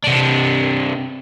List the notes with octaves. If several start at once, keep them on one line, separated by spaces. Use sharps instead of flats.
C3 D4